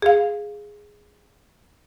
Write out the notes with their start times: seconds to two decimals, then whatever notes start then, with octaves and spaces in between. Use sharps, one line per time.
0.02 G#4 F5